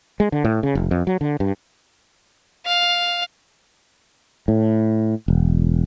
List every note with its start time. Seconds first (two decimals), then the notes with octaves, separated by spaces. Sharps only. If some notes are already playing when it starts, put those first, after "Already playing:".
0.20 G#3
0.32 D3
0.44 A2
0.63 C#3
0.75 F1
0.91 F2
1.07 F#3
1.21 D3
1.40 G2
2.66 F5
4.48 A2
5.28 E1